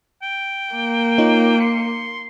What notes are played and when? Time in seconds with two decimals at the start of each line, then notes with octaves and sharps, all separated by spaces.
0.22 G5
0.74 A#3
1.18 D#4 F4 C#5
1.60 C6 C#7